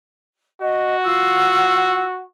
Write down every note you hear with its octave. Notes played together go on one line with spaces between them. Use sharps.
F#4 D#5
F4 F#5 E6